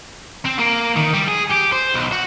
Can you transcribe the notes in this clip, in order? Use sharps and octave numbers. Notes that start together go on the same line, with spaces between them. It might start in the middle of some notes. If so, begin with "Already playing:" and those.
C4
A#3
D#3
G3
G#4
G4
C5
B1
F#4